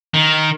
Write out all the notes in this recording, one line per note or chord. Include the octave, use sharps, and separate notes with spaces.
D#3